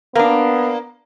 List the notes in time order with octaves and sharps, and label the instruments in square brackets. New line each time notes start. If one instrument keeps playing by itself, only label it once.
[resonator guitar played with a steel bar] A#3 D4 [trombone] B3